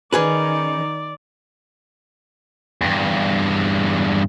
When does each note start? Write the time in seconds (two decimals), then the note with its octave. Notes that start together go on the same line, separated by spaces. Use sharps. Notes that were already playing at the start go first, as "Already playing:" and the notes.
0.13 D#3 C#4 D#4 G#4 B4 D5
2.81 E2 G2